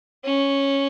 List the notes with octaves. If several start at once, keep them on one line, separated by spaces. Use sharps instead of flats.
C#4